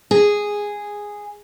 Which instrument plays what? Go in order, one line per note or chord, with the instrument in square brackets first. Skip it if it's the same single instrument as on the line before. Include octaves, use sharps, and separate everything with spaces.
[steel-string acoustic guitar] G#4